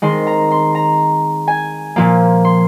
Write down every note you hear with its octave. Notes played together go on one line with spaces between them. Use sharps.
D#3 G#3 C4 C6
A#5
C6
A#5
G#5
A#2 F3 A#3
C6